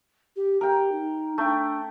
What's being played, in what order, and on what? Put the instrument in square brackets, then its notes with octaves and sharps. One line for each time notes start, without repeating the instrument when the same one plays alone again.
[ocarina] G4
[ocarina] G4 [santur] A#4 G5
[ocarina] D#4
[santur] A3 G5 [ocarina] D4